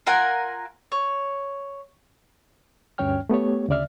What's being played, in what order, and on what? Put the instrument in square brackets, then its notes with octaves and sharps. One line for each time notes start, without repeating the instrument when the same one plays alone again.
[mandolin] F4 A#4 F#5 G#5
C#5
[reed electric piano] D2 G2 C#4 C#5 G5 F6
A3 B3 G4 C#5
D2 C#3 D5 E5 F6